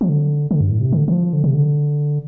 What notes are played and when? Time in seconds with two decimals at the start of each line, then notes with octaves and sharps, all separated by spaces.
0.01 F3
0.09 D3
0.51 D3
0.61 G2
0.71 A2
0.81 C3
0.92 D3
1.08 D3
1.12 F3
1.33 D3
1.44 C3
1.54 D3